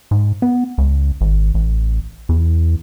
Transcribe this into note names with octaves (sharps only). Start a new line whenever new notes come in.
G#2
B3
C#2
G#1
A1
E2